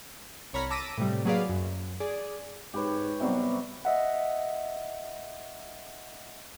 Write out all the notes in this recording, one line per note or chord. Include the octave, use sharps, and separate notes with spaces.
C2 C#5 A#5 B5 F6
A5 D6 E6 A#6 B6 D#7
A2 C3 G3
F#3 A#3 G#4 B4 D5 F5
F#2
G#4 D5
G#2 G4 B4 C#5
C3 F#3 G3 B3
D#5 E5 F#5